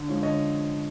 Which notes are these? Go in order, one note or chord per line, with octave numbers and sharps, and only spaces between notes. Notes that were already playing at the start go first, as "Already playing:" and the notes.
Already playing: D3
F3 G#3 C#4
D3 C#5 D#5